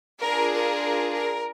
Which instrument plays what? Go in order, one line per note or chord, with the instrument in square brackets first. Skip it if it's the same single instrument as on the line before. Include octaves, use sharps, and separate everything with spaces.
[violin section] D4 F4 G#4 A#4
A#4
A#4